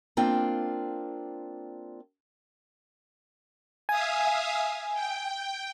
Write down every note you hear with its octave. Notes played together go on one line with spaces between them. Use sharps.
A#3 C4 D4 F4 G5
E5 F5 G#5 D#6
G5